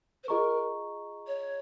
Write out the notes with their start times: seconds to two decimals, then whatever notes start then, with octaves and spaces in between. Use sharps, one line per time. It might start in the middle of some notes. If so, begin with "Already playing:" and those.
0.24 C5
0.28 F4 G#4 A#4 D#5 A#5 C#6
1.27 C#5